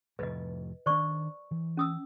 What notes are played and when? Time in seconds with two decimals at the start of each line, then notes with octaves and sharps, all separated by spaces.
0.19 F1 F2 A2 B4 D#5
0.86 D#3 D4 C5 D5 C#6
1.51 E3
1.77 C#4 D#6 E6